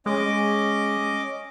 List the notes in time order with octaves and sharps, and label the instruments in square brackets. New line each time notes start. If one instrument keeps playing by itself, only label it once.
[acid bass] G#3 [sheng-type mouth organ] C#4 D#5 D6